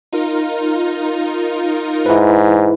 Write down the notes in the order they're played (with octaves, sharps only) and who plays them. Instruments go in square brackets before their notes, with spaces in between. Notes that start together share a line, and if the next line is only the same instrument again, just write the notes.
[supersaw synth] D#4 F4 A#4
[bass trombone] G#2 [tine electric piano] E4 B4